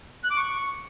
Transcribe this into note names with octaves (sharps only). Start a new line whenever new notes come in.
F#6
D6
C#6